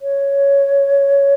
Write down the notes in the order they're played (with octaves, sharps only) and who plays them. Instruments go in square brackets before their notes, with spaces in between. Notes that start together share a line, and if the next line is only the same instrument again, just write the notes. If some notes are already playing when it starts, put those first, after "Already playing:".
[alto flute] C#5